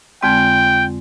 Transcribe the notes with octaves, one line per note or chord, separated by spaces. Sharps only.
F2 D3 G#3 C4 F4 G5